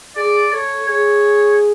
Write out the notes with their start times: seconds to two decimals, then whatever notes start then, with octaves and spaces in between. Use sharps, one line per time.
0.17 G#4 D5
0.53 A4 C#5
0.89 G#4 C#5